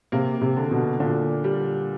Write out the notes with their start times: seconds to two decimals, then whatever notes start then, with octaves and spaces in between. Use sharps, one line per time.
0.12 C3 A#3
0.41 C3
0.56 D3
0.71 B2
1.00 A#2 D3
1.44 G3